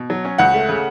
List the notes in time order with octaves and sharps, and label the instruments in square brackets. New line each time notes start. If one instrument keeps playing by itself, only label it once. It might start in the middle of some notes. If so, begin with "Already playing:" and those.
Already playing: [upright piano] B2
F#3
C#4
[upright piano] C#2 [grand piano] F#5
[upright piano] A3
C#3